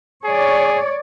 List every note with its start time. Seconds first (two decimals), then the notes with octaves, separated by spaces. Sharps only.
0.25 G#4 C#5 D5